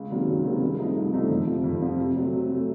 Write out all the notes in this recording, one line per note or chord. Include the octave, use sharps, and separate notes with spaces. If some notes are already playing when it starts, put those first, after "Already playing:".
Already playing: C#2
C3 D#3 F#3 A#3
C#2
C3 D#3 F#3 A#3
C2
C3 F3 A3 D#4
C2
C3 F3 A3 D#4
F2
C3 F3
F2
C3 F3
C3
F#3 A3
C3
F#3 A3